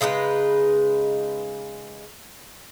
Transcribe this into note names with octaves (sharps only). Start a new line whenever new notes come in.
C#3 G#3 D#4 B4